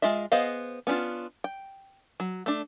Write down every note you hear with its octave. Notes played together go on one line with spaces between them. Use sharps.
G#3 F4 D#5 E5
B3 G#4 C5 D#5 F5
B3 C#4 D4 E4 F4
G5
F#3
A3 D4